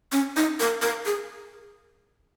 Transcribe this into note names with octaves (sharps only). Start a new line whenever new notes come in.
C#4
D#4
A#4
A#4
G#4